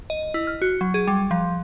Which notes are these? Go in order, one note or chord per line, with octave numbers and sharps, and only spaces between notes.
D#5
E4
F6
F#4
F#3
G#4
G3
F3